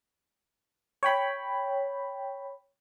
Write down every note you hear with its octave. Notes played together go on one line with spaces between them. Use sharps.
C#5 G5 B5